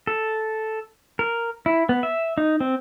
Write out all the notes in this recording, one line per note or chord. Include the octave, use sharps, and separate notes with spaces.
A4
A#4
E4
B3
E5
D#4
C4